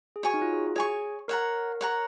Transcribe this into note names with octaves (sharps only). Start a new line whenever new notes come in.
G#4
F#4 C#5 G#5 C#6
D#4
F4
G#4
F#4
G#4 C#5 G#5 C#6
A#4 C#5 F#5 A#5
C#5 F#5 A#5